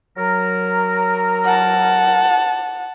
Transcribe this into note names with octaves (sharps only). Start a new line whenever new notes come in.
F#3 A#4
F#5 A5